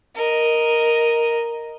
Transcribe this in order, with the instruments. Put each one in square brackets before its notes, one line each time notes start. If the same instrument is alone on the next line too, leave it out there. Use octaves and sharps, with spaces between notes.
[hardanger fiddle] A#4 D#5